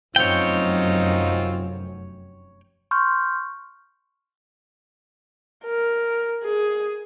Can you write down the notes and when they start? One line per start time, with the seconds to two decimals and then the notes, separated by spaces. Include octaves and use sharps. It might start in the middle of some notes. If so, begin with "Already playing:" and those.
0.16 F1 F#2 C4 D#4 F4 C#5 G5
2.91 C6 C#6 F6 G6
5.65 A#4
6.44 G#4